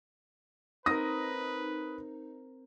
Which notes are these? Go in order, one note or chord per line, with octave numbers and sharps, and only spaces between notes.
C4 D#4 A#4 B4 D#6 A#6